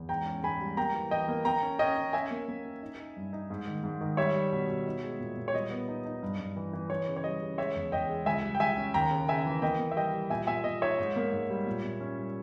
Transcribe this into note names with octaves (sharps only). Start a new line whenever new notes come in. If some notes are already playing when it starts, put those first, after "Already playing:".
Already playing: E2
G#2 G5 A#5
C#4
G#2 G#5 B5
G3
A#3 G5 A#5
E3
E3 D#5 G5
A#3
A#3 G5 A#5
C#4
C#4 D#5 G5
C#4
C#4 E5 G#5
A#3
A#3
C#4
D#4
D#4
G2
D#4
G#2
D#3
G#2
D#3
G3 C#5 E5
G3
B2
B2
D#4
G#3
A#2
A#2
C#5
G3 D#5
B3
D#4
D#4
G2
G2
E3
E3
E3 C#5
C#3
C#5
G3 D#5
C#3
G#3 C#5 E5
E2
E2 D#5 G5
G#3
C#2 E5 G#5
G3
G5
C#2 E5 G#5
C#4
D#2 G5 A#5
C#3
C#3 E5 G#5
E3
A#3 D#5 G5
A#3
E5
G3 D#5 G5
G3
A#2 E5 G#5
A#2 E5 G#5
A#2 D#5
D#4 C#5 E5
G#2
A#3
G#2
G3
A#2
A#2
C#4
G3